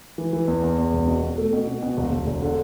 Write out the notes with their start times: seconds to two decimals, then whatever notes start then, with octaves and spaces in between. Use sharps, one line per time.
0.18 E3
0.33 E3
0.48 E2
0.63 E2
0.78 E2
0.93 E1
1.08 B2
1.23 B2
1.38 A3
1.53 B2
1.68 B2
1.83 B2
1.97 E1
2.12 E1
2.27 E1
2.42 D3